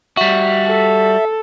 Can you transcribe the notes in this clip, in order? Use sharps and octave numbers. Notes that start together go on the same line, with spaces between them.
G3 F#4 E5
A4